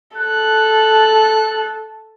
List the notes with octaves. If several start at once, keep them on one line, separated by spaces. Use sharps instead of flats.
A4 F#6